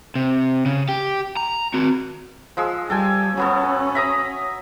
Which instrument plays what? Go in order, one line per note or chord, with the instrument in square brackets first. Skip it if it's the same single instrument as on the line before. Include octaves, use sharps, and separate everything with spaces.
[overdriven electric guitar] C3
C#3
G4
A#5
C4 F#4
[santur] F3 G#3 E6
[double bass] G3 [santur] A4 G5 G#5
[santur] F#3 B3 A4 [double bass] C#4
[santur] E5 A#5 D#6